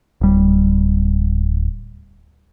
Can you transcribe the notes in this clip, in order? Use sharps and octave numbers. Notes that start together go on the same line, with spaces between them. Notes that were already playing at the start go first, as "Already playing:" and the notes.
D1 G3